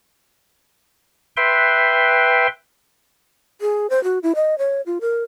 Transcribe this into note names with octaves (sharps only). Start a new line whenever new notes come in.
B4 E5 G5 C6
G#4
C5
F#4
E4
D#5
C#5
F4
A#4